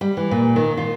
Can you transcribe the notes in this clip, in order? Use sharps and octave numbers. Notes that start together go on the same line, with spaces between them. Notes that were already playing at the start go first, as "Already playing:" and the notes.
G3
E3
A#2
D#3
F4